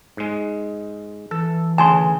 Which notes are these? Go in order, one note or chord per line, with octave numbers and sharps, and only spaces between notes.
G#2 G#3
E3 A4
D2 C#3 G#4 G#5 A5 C6